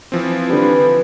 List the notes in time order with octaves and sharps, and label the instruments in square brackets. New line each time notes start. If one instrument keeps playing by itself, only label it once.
[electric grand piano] E3 F3 C4
[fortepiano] D3 G3 [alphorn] B4